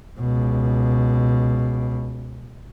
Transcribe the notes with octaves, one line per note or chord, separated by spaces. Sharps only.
C#2 B2